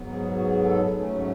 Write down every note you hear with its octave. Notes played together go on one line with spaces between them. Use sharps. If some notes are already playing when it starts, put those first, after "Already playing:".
Already playing: G#2 F#3 B3
G#4
F#4
G#4
A4
G#2 F#3 A3 C#4